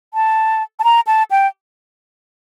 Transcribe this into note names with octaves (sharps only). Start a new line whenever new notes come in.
A5
A5
A#5
A5
G5